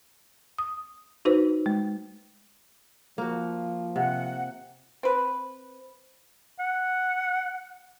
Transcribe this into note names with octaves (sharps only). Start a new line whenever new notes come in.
D#6
D#4 F#4 B4 C5
G#3
F3 A#3 F#4
C3 F#5
C4 B4
F#5